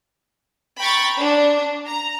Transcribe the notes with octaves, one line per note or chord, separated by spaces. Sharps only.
G5 A#5 B5 C#6 A6
D4
A#5